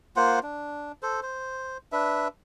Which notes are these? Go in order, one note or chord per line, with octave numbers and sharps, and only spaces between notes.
A#3 F4 C5 F#5
D4
A4 C5
C5
D4 B4 E5